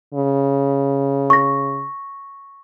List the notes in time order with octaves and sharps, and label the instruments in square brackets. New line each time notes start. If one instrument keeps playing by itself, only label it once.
[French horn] C#3
[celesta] C#6 A#6